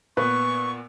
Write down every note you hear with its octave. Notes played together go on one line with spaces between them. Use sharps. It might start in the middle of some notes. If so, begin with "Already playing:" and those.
A#2 B3 B4 C#6